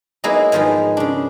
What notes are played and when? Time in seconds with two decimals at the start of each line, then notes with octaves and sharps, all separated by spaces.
0.24 F#3 G#3 A#3 B3 D#4 E4
0.52 G#2 D#3 F3 G#3 B3
0.97 C#3 D4